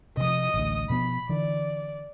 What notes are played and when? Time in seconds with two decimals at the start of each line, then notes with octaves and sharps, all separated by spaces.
0.17 C3 F3 D#5 D#6
0.54 A1 D2
0.90 B2 F3 B3 B5
1.29 D3 E3 D5